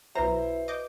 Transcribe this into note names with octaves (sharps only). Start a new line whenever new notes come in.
B1 E4 F#4 B4 C5 A#5
D#5 D6 G6